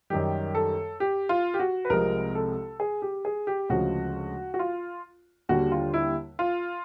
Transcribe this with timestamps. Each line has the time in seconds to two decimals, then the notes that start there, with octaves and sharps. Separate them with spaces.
0.10 F#2 D#3 G3 G4
0.55 A4
1.00 G4
1.29 F4
1.54 G4
1.60 F#4
1.85 B4
1.90 C2 C3 F3 G#3 A#4
2.35 A4
2.80 G#4
3.02 G4
3.25 G#4
3.47 G4
3.69 D2 C#3 F3 G#3 F#4
4.54 F#4
4.59 F4
5.49 D#2 D3 G3 F#4
5.72 F4
5.94 E4
6.39 F4